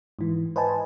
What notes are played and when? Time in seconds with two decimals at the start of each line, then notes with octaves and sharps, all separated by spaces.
0.19 G#2 E3
0.56 B4 C5 D#5 G#5 A5